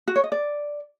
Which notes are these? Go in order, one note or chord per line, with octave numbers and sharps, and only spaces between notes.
F#4
C#5
D#5
D5